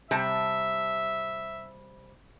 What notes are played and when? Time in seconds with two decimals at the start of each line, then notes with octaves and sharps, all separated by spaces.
0.11 C3 G3 E5 A5